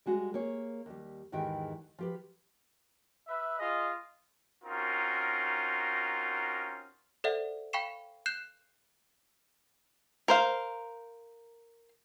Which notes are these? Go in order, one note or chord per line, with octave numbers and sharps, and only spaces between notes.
G3 G#3 F#4 G#4
A#3 G#4 C#5
D#2 G3
E2 G#2 D#3 E3 G4 G5
F3 G4 B4
B4 E5
F4 G#4 D#5
C4 C#4 D#4 F4 F#4 A#4
A4 C5 D5 E5 F#5
F5 G5 B5 C#6 C7 E7
F#6 G6 C7 E7
A#4 C5 F5